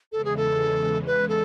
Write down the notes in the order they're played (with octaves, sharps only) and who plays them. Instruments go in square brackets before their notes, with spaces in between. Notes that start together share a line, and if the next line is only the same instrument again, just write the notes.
[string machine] E2 C#3 E3 G#3 [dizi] A4
[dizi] G#4
A4
B4
A4